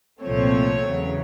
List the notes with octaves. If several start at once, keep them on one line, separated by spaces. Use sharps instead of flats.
C2 A#2 F3 A3 C4 C#5
E2 C#3 F#3